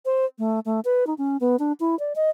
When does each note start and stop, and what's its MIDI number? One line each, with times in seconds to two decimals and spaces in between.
0.06 0.26 72
0.39 0.60 57
0.66 0.80 57
0.85 1.07 71
1.07 1.14 63
1.18 1.37 61
1.41 1.56 59
1.59 1.72 62
1.80 1.98 64
1.99 2.13 74
2.16 2.30 75